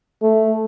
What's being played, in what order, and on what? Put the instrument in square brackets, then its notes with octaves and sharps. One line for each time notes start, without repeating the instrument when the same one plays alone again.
[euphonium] A3